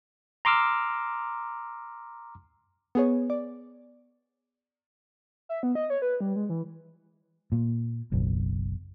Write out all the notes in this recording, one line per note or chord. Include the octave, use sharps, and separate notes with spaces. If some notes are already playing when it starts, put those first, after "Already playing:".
A#5 C6 D6 E6 F6
B3 G#4 C#5
D5
E5
B3
D#5
C#5
B4
G3
G#3
E3
A#2
F#1 B1